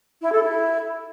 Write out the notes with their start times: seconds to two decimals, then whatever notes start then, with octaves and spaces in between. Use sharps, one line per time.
0.21 E4
0.32 A4
0.42 E4